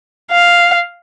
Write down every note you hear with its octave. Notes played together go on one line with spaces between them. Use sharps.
F5